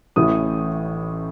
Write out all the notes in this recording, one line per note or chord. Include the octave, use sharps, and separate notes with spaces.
A1 A2 E3 D#6